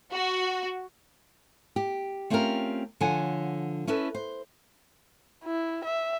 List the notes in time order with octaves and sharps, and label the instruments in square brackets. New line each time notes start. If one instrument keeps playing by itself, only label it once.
[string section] F#4
[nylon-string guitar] G4
A3 C4 C#4 F4 G4 A#4
D3 F3 C#5 F#5 G#5
C#4 E4 A4 B4
C5
[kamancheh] E4
E5